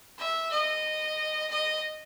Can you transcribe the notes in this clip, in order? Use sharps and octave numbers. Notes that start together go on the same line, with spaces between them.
E5
D#5
D#5